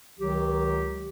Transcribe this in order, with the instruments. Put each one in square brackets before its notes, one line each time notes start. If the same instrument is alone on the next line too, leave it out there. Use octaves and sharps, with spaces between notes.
[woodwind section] C#2 D#3 F#3 G4